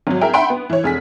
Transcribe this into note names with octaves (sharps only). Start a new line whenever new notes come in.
G#1 F#3
E4 G#4 A#4 E5 G5
E5 F#5 G5 B5 C6 D7
B3
E3 C#5
F1 G#4 B6